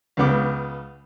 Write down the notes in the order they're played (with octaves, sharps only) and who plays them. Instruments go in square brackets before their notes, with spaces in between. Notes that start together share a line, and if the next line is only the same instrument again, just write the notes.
[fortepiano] C#2 C#3 B3 D6